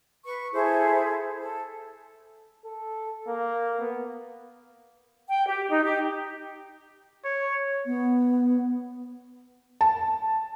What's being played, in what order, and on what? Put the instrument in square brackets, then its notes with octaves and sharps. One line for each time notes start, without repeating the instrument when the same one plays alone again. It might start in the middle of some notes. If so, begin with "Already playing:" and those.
[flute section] B4 C#6
E4 G#4 A4 C5
A4
[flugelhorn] A4
A#3
B3
[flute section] G5
G4
D#4
G4
[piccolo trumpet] C#5
[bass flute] B3
[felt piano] A5